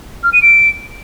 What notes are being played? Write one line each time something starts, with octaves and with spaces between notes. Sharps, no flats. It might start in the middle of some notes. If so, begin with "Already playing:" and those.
F6
D#7
D7